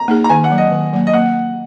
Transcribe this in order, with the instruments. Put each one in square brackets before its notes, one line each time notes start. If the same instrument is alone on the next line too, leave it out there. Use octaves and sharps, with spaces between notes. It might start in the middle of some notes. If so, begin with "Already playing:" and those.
Already playing: [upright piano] A#5
[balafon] A#3 D#4 G#4
[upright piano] A#5
[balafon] D#3 [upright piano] G#5
[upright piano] F#5
[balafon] F#3 A#3
[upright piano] D#5
[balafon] D#3
F#3 A#3
[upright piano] D#5
[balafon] A#3 [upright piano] F#5